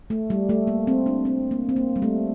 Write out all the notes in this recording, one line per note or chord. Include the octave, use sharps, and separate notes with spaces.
A3
G3
A3
A#3
C4
D4
C4
A#3
C4
A#3
G3
A3